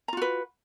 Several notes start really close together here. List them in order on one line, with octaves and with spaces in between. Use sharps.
A#5 F4 F#4 B4